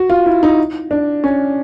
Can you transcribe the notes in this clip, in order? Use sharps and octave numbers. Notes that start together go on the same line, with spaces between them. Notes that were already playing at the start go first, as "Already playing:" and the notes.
Already playing: F#4
F4
E4
D#4
D4
C#4